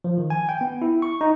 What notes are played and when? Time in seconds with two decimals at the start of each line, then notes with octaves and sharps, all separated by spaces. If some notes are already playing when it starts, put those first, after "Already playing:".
0.04 F3
0.18 D#3
0.30 G#5
0.49 G5
0.61 B3
0.82 E4
1.02 C#6
1.21 D#4